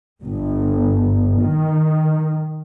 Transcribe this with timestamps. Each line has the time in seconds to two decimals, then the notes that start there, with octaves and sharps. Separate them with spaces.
0.24 G1
1.40 D#3